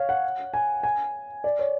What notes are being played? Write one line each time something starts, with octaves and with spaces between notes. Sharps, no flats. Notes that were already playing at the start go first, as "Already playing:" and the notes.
Already playing: C#5 F5
F#5
G#5
G#5
D5
C#5